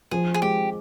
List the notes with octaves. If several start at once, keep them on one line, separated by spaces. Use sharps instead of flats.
F3 G#4
G#4
G#3 G4